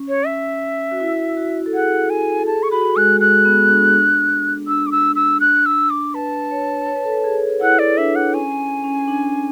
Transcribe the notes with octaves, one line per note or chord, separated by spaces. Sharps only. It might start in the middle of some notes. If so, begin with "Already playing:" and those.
Already playing: C#4
C#5
E5
F#4
E4
F#4
A4
G#4 F#5
G#5
A4
G#4 A5
C#6
F#4 B5
G#3 F#6
G#3 F#6
B3
D4
D4
D4 E6
D6
E6
E6
F#6
E6
D6
B4 A5
C#5
C#5
B4
A4
B4
G#4
E4 F#5
D5
D4 E5
F#5
C#4 G#5
C#4
D4